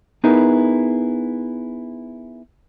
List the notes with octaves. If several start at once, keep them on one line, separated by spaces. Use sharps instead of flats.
B3 D#4 E4 G#4 A#4 B4